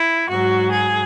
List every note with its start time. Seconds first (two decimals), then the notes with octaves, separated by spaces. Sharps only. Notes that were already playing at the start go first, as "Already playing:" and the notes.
Already playing: E4
0.29 G#2 F#3 F#4
0.71 G#4